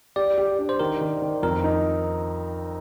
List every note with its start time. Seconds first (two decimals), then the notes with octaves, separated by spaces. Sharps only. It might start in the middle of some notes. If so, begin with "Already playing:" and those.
0.16 G4 D5
0.38 G4
0.59 D4
0.69 C5
0.80 D#3 A#4
1.01 D#3
1.22 D#3
1.43 F2 A#4
1.64 D#4